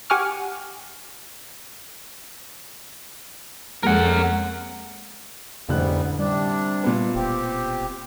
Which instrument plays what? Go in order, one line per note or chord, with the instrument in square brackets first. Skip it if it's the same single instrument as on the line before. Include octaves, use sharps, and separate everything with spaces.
[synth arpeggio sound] G4 F#5 G#5 C#6 D6 F6
[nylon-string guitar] F2 G#3 A#3 [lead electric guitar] A#4 F#5
[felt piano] A1 D3 F#6 [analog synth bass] F2 [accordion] G#2 G3 B3
[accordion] C3 D4 [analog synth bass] G3
[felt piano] A#2 B3
[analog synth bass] E1 [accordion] C4 G4